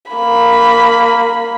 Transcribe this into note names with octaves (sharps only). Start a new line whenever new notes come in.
A#3 B5